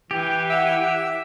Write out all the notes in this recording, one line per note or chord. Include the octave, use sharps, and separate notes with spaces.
E3 G4 G5
E5 F#5